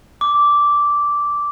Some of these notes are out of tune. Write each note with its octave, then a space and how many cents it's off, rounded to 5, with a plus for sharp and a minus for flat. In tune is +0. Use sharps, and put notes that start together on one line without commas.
D6 -10